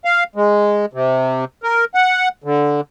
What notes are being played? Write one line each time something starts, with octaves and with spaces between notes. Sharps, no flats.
F5
G#3
C3
A#4
F#5
D3